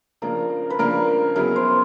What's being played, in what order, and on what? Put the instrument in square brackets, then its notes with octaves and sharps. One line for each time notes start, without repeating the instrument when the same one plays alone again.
[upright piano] C#3 F3 A#3 D4 [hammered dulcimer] A#4
[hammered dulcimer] B4
[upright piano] C#3 F3 A#3 D4 [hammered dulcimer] A#4
[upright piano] C#3 F#3 B3 E4 G#4 [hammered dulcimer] A#4
[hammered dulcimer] C5